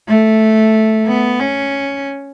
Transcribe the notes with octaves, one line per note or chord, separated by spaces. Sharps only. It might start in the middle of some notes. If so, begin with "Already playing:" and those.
A3
B3
C#4